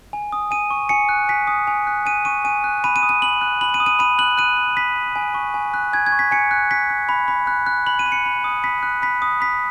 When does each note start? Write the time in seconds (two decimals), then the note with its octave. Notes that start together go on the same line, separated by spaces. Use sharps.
0.13 G#5
0.32 D#6
0.51 G#5 D#7
0.70 C#6
0.89 G#5 C#7
1.09 F#6
1.29 G#5 B6
1.47 D#6
1.67 G#5
1.87 F#6
2.06 G#5 D#7
2.25 C#6 D#7
2.45 G#5 D#7
2.64 F#6
2.84 B5 D#7
2.96 D#7
3.03 D#6
3.09 D#7
3.22 B5 F#7
3.41 F#6
3.61 B5 F#7
3.74 D#7
3.80 D#6
3.86 D#7
3.99 B5 D#7
4.18 F#6 F#7
4.38 F#6 D#7
4.57 F#6
4.77 B5 B6
4.96 B5
5.16 G#5
5.34 C#6
5.54 G#5
5.74 F#6
5.93 G#5 G#6
6.06 G#6
6.12 C#6
6.19 B6
6.31 G#5 C#7
6.51 F#6
6.71 F#6 B6
6.90 F#6
7.09 B5
7.28 B5
7.47 F#6
7.66 F#6
7.86 B5 F#7
7.99 D#7
8.06 B5
8.12 C#7
8.26 B5
8.44 D#6
8.64 B5 B6
8.83 F#6
9.02 B5 B6
9.22 D#6
9.41 B5 B6